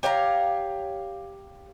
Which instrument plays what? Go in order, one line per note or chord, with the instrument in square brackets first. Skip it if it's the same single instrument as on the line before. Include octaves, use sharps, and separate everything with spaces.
[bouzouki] G4 C#5 F5 A#5